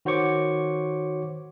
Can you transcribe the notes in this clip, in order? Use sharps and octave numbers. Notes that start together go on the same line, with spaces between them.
D#3 F#4 C5 C#5 C#6 D6